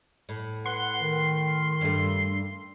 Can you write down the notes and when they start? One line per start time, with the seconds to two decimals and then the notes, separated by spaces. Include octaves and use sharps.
0.29 A2
0.66 B4 F#5 C6
1.02 D#3
1.81 G2 A3